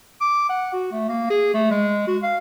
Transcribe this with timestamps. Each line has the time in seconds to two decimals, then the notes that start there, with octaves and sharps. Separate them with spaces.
0.21 D6
0.49 F#5
0.73 F#4
0.92 A3
1.08 A#3
1.30 G#4
1.54 A3
1.71 G#3
2.07 F#4
2.23 F5